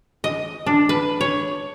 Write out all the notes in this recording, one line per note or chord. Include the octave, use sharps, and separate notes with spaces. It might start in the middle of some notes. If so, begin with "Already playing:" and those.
D#5
D4
B4
C#5